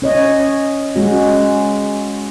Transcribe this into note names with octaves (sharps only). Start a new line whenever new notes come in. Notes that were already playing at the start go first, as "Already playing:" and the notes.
C#4 C#5 D#5
G#3 C#4 F#4